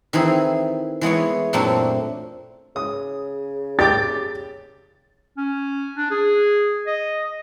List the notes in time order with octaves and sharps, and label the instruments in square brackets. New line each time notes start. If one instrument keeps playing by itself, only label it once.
[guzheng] D#3 E3 C4 G#4
E3 G#3 B3 C#5
F#2 A#2 F#3 A3 C4 D4
[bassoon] C#3 [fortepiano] D#6
[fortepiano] G4 G5 D6 [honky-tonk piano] A6
[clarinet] C#4
D4
G#4
D#5